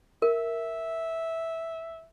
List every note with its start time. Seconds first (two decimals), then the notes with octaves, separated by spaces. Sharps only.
0.22 A#4 E5